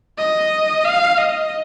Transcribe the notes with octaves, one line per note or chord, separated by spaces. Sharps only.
D#5
F5
D#5